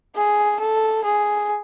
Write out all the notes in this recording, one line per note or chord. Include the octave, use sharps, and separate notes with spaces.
G#4
A4
G#4